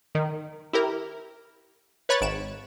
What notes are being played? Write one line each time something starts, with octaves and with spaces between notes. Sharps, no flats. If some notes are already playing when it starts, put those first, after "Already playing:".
D#3
E4 G4 A#4
B4 C#5 B5 F#6 A6
G#1 D7 E7